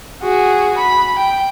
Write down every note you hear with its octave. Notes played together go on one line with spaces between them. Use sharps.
F#4 G#4
B5
G5